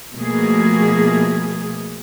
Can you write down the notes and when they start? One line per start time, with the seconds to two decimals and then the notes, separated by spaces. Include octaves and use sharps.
0.15 B2 F3 A3 A#3 G#4